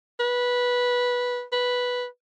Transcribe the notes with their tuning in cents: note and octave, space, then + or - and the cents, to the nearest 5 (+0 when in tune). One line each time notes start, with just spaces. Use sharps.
B4 -10
B4 -5